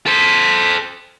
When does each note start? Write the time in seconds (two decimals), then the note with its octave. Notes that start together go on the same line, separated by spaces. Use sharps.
0.06 A4 C5 B6